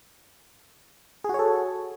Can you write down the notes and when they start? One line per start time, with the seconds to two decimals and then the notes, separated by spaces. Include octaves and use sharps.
1.24 G#4
1.29 F#4
1.34 C#5
1.39 A4